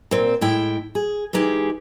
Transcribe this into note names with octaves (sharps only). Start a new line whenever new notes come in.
A#2 C4
A2 G#3 E4 G5
G#4
E3 G#3 D#4 G4 G#4